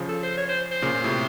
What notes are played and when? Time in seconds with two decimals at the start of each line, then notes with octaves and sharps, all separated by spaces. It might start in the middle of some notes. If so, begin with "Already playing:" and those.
Already playing: C#3 F3
0.09 A4
0.23 C5
0.38 C#5
0.49 C5
0.71 C5
0.82 A#2 C#3
0.94 A#2
1.04 A2 C3